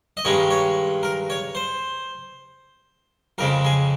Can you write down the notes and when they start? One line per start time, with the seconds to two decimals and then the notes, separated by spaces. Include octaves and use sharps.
0.17 D#5
0.25 G2 D#3 G#3 C#4 C#5
0.51 C#5
1.03 A#4
1.30 C#5
1.55 C5
3.38 F2 C#3 G#3 A#4
3.65 G#4